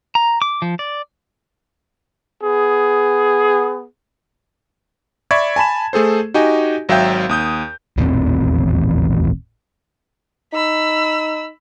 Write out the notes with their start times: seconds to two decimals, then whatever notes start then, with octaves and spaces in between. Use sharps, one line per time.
0.15 A#5
0.42 D6
0.62 F3
0.79 D5
2.43 B3 G#4
5.31 D5 E5 B5 C#6 G#6
5.56 G#5 A5 B5 E7
5.93 A3 G#4 A4 C5
6.34 D#4 F#4 G4 D#5 G#5
6.89 G#1 F#3 E5 F5 G5 G6
7.29 D#2 D#6 G6
7.97 D#1 A1 E2 C4
10.53 D#4 B5 E6